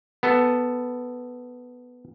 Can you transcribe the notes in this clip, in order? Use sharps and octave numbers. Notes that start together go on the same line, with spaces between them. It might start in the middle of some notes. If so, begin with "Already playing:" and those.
B3 A4